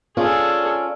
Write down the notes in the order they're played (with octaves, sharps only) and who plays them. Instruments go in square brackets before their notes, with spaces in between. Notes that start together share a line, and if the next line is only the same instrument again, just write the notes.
[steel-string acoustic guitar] C#4 D4 F4 [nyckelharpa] G#4 A4